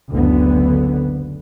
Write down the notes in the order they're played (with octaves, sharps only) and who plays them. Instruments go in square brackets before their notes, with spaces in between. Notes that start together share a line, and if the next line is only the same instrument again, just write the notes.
[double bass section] F#1 D2 D3 B3